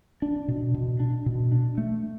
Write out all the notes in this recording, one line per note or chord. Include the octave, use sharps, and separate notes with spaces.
D4
B2
B2
D4
B2
D4
A3